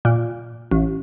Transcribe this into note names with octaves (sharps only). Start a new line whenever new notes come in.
A#2
A1